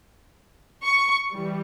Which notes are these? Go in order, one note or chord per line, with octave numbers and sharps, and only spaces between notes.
C#6
E3 G3